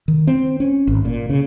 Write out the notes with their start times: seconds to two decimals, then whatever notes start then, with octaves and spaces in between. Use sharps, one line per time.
0.08 D#3
0.27 C4
0.60 C#4
0.87 G#1
1.05 A#2
1.30 C#3